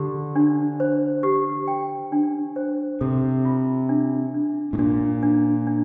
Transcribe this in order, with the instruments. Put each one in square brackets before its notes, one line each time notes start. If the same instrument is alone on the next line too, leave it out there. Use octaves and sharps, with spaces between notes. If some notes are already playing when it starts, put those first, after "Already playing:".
Already playing: [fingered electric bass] D3 [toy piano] G4
[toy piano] D4
C5
G4
G5
D4
C5
[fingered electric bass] C3 [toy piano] A4
[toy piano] F4
D4
D4
[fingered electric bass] A2
[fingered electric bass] A#2 [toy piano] D4
[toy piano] D4
D4